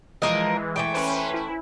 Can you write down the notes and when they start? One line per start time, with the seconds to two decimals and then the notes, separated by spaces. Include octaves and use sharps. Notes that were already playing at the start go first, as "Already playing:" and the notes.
0.22 E3 F3 G#3 A#4 D#5
0.76 E3 A3 G5
0.93 C#4 B4 C5
1.34 E4